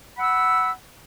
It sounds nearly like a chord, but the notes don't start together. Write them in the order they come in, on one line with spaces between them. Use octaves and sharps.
B5 F#5 E6